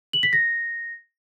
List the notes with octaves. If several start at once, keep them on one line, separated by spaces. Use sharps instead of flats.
F#7
B6
A#6